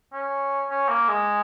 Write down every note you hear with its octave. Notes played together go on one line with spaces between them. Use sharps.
C#4
C#4
A#3
G#3